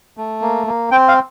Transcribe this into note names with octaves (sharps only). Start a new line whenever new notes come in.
A3
A#3
A#3
C4 G5
F5